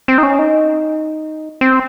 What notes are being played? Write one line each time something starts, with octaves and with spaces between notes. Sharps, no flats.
C4
D#4
C#4
D#4
C4